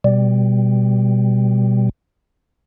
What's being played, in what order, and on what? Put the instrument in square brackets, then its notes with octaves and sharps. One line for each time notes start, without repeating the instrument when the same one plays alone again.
[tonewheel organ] B2 G3